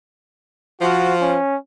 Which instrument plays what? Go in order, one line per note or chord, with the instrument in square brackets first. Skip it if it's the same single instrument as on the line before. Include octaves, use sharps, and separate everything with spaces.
[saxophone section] F3 [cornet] F#4
[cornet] C#4